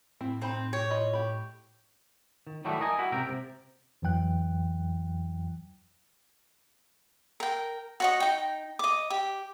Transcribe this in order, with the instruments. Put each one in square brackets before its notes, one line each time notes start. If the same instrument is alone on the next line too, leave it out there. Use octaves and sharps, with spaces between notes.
[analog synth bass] A2 [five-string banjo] C4 E4
[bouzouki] C4 [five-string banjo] D#4 B5
[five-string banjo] G4 [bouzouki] C#5
[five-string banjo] F4 D#5 B5
G4 B5
[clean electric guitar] D#3
D#3 F#3 G3 A3 B3 E4
A#4 D#5 G#5
G3 E4 F#4
C#2 C3 A#4 E5 G5
C3
[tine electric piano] F2 E3 F#3 G5 F#6
[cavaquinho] A#4 G5
F#4 C#5 D#5
D#4 G5
D#5 D6
G4